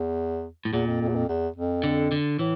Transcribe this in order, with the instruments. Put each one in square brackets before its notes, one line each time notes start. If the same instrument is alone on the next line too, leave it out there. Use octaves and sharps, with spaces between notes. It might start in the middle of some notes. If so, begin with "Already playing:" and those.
Already playing: [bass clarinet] E2
[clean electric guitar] A2
[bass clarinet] E2 [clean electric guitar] A#2
[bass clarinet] F2
F2
E2
F2
E2
F2
[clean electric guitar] D3
D3
[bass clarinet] A2 [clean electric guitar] E3